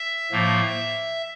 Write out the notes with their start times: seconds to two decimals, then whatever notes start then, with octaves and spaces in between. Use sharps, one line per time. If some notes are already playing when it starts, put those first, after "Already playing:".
Already playing: E5
0.32 A2 F3 A#3